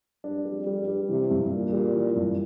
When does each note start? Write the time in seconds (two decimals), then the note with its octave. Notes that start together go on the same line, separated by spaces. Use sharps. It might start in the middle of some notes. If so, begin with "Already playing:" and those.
0.24 G2 D4
0.45 G3
0.52 F2
0.67 G3
0.81 G2
0.88 G3
1.09 C3 E3
1.31 G2
1.51 A#2 D4
1.73 G3
1.95 E3
2.16 G2